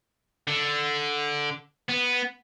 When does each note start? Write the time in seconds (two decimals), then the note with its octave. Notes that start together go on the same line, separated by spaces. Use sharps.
0.48 D3
1.89 B3